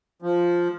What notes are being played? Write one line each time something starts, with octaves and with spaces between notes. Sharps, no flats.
F3